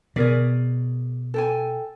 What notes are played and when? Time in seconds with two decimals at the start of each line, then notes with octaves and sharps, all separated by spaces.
0.16 B2 G#4 A#4 D5
1.34 A4 G5 G#5